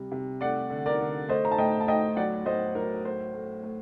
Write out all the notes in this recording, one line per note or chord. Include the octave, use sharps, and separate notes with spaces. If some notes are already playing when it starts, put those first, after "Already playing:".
Already playing: C3 G3
C3
A3 D5 F#5
D3
A#4 D5
D3
A3 C5 D#5
A#5
A5
A2 D#5 G5
A5
A2 D#5 G5
F#3 D5 F#5
A2 C5 D#5
F#3 A#4
A3 C5
A3
A3